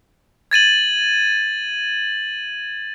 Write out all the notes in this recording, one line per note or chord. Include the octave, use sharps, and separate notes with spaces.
G#6 A6 D#7 F#7